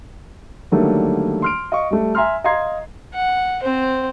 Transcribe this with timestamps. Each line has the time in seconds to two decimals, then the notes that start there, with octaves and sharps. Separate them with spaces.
0.71 D3 D#3 F#3 G3 A3 A#3
1.42 C6 F6 D7
1.72 D#5 F5 C#6
1.91 G3 A3
2.15 E5 G#5 A#5 C6 F6
2.44 D#5 F5 A#5 C6 G#6 C7
3.14 F#5
3.63 C4 C5